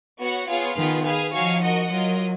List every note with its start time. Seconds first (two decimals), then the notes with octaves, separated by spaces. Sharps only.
0.21 B3 F#4 C#5 F#5
0.49 B3 F4 G#4 C#5 F5
0.77 D#3 B3 F4 G#4 B4
1.06 G#4 B4 F5 G#5
1.34 F3 D#4 F#4 C#5 F5 G#5
1.62 F#4 A#4 D#5 F#5
1.91 F#3 F4 A#4 D#5